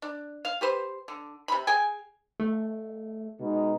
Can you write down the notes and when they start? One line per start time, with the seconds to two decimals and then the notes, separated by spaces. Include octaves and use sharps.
0.02 D4
0.45 F5
0.61 G4 B4 C5
1.08 D3
1.48 C3 B5
1.67 G#4 G5 G#5
2.40 A3
3.40 B2 G#3 D#4